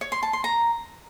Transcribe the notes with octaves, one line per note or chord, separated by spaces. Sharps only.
C#5
C6
A5
C6
A#5